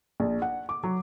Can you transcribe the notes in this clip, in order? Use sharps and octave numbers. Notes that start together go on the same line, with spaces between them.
A#1
F#5
D6
F#3